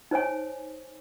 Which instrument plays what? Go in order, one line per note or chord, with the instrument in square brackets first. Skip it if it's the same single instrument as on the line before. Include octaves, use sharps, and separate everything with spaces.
[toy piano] D#4 C5 C#5 G#5